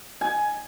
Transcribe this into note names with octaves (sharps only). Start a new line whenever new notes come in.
G#5